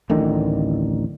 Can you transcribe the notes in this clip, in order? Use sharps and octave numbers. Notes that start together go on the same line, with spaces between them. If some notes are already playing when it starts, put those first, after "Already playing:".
D1 A1 D3 D#3